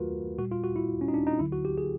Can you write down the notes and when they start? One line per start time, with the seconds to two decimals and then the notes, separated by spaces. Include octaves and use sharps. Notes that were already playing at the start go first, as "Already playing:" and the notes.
Already playing: D#2 D#3 F#3 A3 F4 F#4 A#4 B4
0.38 A#2 G3 F#4
0.51 F4
0.64 F#4
0.76 E4
1.01 C#4
1.08 D#4
1.14 D4
1.27 D#4
1.39 D2 D3 F#3 E4
1.52 F#4
1.65 G4
1.78 G#4